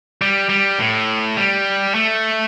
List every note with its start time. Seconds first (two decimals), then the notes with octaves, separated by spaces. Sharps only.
0.22 G3
0.49 G3
0.79 A2
1.37 G3
1.95 A3